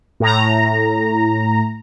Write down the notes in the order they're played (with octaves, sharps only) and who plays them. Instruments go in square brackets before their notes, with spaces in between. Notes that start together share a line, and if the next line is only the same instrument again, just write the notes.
[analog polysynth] A2 A#5